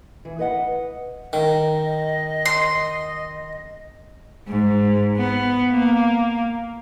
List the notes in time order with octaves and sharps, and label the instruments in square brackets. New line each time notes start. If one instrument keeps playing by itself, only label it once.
[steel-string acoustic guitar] E3
B4 D#5 F#5
[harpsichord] D#3 [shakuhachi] D#5
[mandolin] C6
[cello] G#2
B3
A#3